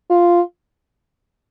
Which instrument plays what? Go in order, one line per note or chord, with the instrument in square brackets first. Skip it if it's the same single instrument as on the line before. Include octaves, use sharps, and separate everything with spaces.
[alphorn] F4